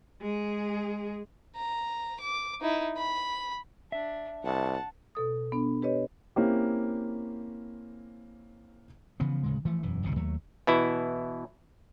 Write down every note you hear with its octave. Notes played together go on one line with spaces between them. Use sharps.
G#3 G#4
A#5
D6
D#4 E4
B5
D4 E5
C2 F#5 A5
B2 A4 D#6
B3 D4
G4 B4 C#5 D#5
A#3 C4 C#4 E4 G4
C#3 E3 F3 B3
D1 C#3 G#3
E3 F3 A3
E1 F#2 E3
F#1 C2 B2 D#3
D#2 F#3 A3
B2 E3 E4